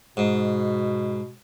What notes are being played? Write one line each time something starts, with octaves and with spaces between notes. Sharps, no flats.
G#2 B2